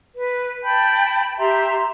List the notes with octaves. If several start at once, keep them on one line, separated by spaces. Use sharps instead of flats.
B4
G5 A5 B5 G6
G4 E5 A#5 C6